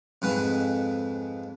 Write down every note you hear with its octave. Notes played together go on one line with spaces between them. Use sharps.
F2 G#2 B4